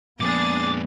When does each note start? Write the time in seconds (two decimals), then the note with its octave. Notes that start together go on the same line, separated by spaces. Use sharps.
0.20 F2 A#2 B3 D4 G#4 D6 A6